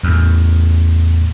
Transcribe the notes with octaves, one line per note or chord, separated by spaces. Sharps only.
E2 A2